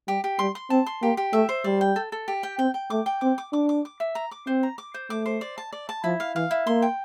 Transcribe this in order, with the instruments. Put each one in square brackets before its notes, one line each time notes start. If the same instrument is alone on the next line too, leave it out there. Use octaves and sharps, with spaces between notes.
[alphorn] G3 [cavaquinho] G4
[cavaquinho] G4
[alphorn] G3 [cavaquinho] C6
[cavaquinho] C6
[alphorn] C4 [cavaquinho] A5
[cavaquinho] C6
[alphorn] A#3 [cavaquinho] G4
[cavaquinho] G4
[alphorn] A3 [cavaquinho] E5
[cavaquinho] C5
[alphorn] G3 [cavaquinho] D5
[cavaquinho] G5
A4
A4
G4
G5
[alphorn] C4 [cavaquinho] G5
[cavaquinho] G5
[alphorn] A3 [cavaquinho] D6
[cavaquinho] G5
[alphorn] C4 [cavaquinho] D6
[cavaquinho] D6
[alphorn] D4 [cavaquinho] D6
[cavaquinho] D6
D6
E5
A#5
D6
[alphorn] C4 [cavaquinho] C5
[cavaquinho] A#5
D6
C5
[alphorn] A3 [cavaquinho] D6
[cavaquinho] C5
D5
A5
D5
A5
[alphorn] F3 [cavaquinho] E4
[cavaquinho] F5
[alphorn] E3 [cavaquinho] F5
[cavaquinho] E4
[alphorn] A#3 [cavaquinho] C6
[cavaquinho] G5